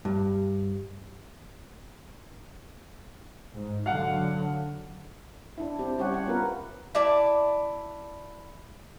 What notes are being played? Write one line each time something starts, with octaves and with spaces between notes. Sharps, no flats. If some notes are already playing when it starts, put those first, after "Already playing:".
G2
G#2
D3 F#3 F5 F#5
D4 E4
C4 G4
G3 C#4 G4 C#5 F#5
F#5
B3 F4 A#4 B4
E4 D5 A5